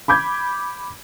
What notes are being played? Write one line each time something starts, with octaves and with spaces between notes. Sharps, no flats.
B5 D6 G6 G#6